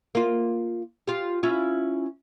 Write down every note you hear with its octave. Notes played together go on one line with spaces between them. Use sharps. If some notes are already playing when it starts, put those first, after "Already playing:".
A#3 F4
F4 G4
C#4 E4 F4